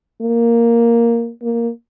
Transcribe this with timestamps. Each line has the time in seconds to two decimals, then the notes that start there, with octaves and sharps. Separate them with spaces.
0.21 A#3
1.42 A#3